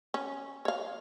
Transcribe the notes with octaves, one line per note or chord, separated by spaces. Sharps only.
C#4
C#5 F5